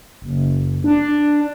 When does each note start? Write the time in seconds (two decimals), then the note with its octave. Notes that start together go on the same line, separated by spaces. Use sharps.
0.22 F#1
0.84 D4